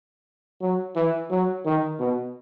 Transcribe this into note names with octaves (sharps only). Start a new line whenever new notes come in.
F#3
E3
F#3
D#3
B2